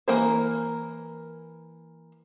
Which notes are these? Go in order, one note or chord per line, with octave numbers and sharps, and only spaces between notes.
E3 A#3 A#4 C5